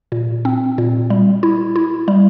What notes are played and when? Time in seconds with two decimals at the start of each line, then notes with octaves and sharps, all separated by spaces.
0.12 A#2
0.45 C4
0.78 A#2
1.10 G3
1.43 E4
1.76 E4
2.08 G3